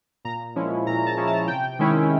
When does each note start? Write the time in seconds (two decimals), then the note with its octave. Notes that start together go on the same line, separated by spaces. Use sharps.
0.25 A#2 A#5
0.56 F3 G#3 C#4 E4
0.87 A#2 A#5
1.06 A5
1.17 F3 G#3 C#4 E4
1.27 A5
1.48 C3 G5
1.79 D#3 G#3 C#4 E4